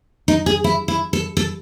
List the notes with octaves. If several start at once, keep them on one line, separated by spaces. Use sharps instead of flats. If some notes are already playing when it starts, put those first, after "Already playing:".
D#4
G#4
E4
E4
A4
A4